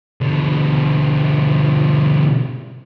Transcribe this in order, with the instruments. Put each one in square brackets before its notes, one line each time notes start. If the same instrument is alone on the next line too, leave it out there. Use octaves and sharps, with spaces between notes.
[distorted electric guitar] B2 D3